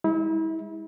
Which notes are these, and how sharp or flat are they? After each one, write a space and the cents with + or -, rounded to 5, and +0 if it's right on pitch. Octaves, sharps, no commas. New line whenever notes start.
G#3 -35 E4 -35